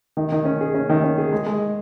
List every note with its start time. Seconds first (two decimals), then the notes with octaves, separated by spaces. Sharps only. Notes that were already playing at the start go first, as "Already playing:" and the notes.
0.17 D#3
0.32 D#3
0.45 C#4
0.61 G#4
0.74 C#4
0.89 D#3
1.04 C#4
1.18 G#4
1.32 G#3
1.46 G#3